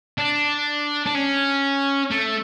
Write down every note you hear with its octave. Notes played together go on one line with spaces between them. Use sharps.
D4
D4
C#4
A3